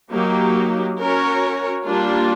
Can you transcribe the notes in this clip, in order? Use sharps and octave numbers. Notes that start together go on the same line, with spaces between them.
F#3 A#3 D#4 G4
C#4 F#4 A#4 C#5
G3 A#3 D4 F4